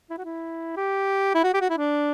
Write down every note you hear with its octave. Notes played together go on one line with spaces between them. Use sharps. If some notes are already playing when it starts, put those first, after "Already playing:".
E4
F#4
E4
G4
E4
F#4
G4
F#4
E4
D4